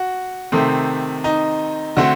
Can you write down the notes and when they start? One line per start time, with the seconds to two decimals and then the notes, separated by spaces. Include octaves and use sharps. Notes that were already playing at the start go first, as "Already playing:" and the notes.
Already playing: F#4
0.52 C3 D#3 A3 C4
1.24 D#4
1.96 D3 A3 C4 F#4